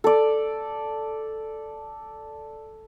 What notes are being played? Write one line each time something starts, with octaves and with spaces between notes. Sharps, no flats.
A4 D5